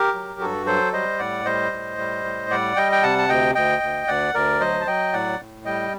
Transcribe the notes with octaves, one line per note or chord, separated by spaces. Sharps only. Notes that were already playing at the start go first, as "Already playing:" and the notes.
Already playing: G4 A#4
F#3
G2 F#4 A4
F#3 A4 C5
G3 C5 D#5
A2 D5 F#5
G3 C5 D#5
A2
G3
A2
G3 D5 F#5
G3 D#5 G5
G5
C3 F#5 A5
A5
D2 D#5 G5
D2 D#5 G5
D2
D2 D5 F#5
D2 A#4 D5
F#3 C5 D#5
A5
F#3 D#5 G5
A2 D5 F#5
A2
G3 D#5 G5